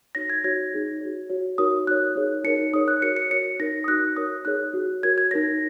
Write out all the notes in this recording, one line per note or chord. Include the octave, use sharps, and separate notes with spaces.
D#4 F#4 C#5 A#6
G#6
D#4 F#4 C#5 G#6
D#4 G#4 C#5
F#4 C#5
F#4 C#5
D#4 F#4 A#4 C#5 D#6
D#4 F#4 A#4 C#5 F#6
D#4 G#4 C#5
D#4 F#4 A#4 C#5 C#7
D#4 G#4 C#5 D#6
F#6
F#4 A#4 C#5 C#7
C#7
F#4 A#4 C#5 C#7
D#4 A#4 C#5 A#6
D#6
D#4 F#4 A#4 F#6
F#4 A#4 C#5 D#6
D#4 G#4 C#5 F#6
F#4 C#5
F#4 A#4 C#5 G#6
G#6
D#4 A#4 C#5 A#6